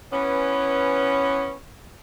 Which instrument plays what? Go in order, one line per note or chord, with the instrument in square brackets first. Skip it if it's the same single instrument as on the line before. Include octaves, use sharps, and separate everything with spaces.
[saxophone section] E3 B3 C#4